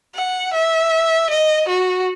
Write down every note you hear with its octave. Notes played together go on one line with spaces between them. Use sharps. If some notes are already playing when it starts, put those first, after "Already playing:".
F#5
E5
D#5
F#4